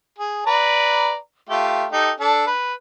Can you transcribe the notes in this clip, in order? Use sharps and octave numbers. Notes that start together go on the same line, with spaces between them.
G#4
B4 D5 A#5
A3 F4 G4
D#4 G4 A4
D4 A4
B4